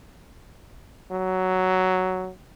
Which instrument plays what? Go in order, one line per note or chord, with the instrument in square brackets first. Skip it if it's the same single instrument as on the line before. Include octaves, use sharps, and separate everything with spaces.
[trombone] F#3